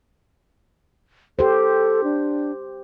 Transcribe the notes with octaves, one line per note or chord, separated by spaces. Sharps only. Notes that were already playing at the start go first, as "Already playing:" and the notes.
G4 A4 C5
D4